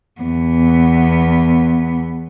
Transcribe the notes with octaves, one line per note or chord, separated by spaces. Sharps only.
E2 B3